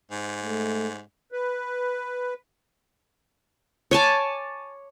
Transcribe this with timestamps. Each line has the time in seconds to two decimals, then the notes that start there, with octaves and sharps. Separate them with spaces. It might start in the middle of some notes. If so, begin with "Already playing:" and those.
0.11 G#2
0.43 A3
1.32 B4
3.91 C#5 G#5 A5 D6